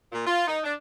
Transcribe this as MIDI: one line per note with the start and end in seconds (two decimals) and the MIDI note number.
0.12 0.24 46
0.26 0.45 65
0.47 0.59 63
0.64 0.74 62